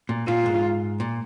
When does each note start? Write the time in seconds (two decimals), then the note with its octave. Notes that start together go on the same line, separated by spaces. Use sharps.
0.09 A#2
0.27 A#2 F4
0.46 G#2
1.00 A#2